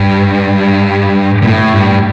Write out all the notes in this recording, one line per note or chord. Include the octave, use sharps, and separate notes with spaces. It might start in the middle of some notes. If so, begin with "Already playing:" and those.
Already playing: G2
A#2
A2
G2